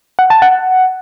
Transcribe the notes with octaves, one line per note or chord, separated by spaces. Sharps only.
F#5
A5
F#5